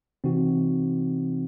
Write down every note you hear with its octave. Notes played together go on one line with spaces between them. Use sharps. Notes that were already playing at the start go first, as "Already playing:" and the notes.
C3 E3 C4 D#4 F#4